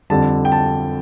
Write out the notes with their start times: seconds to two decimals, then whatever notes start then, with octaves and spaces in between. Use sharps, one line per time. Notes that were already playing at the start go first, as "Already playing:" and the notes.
0.10 F2 D3 G3 A5
0.45 G5
0.52 A5